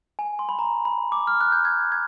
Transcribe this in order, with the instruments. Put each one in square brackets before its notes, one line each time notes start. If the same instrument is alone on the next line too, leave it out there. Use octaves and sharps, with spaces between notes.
[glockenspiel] G#5
C6
B5
A#5
B5
D6
F6
F#6
G6
G#6
G#6